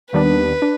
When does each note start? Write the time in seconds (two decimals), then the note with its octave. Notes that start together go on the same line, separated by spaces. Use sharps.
0.12 D#2 D#3 G3 B3 D4 B4
0.62 D4